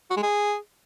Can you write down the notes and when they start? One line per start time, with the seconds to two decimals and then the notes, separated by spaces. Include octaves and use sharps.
0.11 F#4
0.17 G#3
0.23 G#4